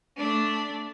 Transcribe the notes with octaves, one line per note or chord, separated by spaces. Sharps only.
A3 D4